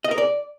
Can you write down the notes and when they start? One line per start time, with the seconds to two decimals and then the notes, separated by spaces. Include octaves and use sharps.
0.04 D#5
0.11 A#4
0.18 D5